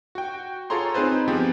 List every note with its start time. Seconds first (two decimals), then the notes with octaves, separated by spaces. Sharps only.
0.15 F#4 G5
0.70 F4 G#4 A4 C#5 A#5 C6
0.94 C4 D#4 G#4 B4 C5
1.28 F3 B3 C4 G4 G#4